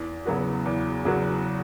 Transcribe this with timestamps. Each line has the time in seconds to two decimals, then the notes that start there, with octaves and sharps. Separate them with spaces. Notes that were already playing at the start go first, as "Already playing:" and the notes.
Already playing: E2
0.25 C#3 F#3 B3 F#4
0.66 E2
1.05 C#3 F#3 B3 F#4